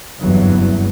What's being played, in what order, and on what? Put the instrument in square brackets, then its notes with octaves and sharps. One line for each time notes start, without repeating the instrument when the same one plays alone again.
[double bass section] F#1 E2 G2 E3 F#3